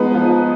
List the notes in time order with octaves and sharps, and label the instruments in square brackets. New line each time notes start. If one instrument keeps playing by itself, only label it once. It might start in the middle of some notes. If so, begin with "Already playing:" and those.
Already playing: [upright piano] F3 G#3 B3 D#4 B4
F3